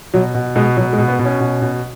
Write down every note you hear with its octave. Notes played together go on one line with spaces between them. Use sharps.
B2 F#3
B2
B2 G#3
B2 F#3
G#3
B2
B3
B2
C#4
B2
B2